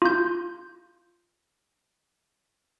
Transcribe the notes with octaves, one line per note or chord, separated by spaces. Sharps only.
F4 G6